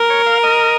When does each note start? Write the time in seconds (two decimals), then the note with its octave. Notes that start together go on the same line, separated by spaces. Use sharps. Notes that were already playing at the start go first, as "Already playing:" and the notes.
Already playing: A#4
0.10 C#5
0.26 F5
0.43 D#5